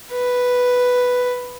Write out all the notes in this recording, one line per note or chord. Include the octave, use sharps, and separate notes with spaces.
B4